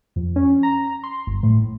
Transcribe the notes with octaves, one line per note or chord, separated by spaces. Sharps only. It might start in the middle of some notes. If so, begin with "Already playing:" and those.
F2
C#4
A#5
C6
G1
A2